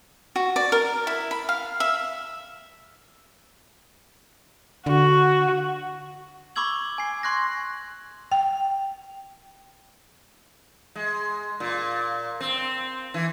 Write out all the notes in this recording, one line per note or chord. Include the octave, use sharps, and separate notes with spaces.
F#4
D5
A#4
E4
B5
F5
E5
D3 F#4
B5 C#6 D6 E6 G#6 F#7
G#5 C7
C6 C#6 F#6 G#6 A#6
G5
G#3
A#2
C4
E3